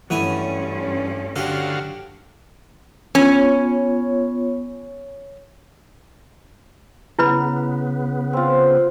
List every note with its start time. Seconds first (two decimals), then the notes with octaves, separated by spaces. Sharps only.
0.10 G2 E3 F#3 A3 B3 C#4 E4 G#5
1.36 D3 F#4 G4 A4 F5
3.15 B3 C#4 F4 C#5
7.19 C#3 B3 E4 B4 B5
8.33 C4 F4